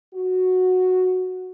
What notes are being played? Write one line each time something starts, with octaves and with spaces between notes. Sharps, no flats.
F#4